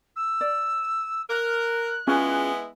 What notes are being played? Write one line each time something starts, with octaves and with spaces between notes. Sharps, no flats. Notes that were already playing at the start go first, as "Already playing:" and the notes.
E6
D5
A#4 F#6
G#3 B3 C#4 E4 F4 G#4